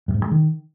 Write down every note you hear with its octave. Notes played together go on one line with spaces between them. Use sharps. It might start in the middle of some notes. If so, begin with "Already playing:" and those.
G2
G#2
G2
G#3
D#3